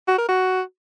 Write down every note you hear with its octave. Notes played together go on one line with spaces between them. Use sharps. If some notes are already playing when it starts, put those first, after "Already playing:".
F#4
A#4
F#4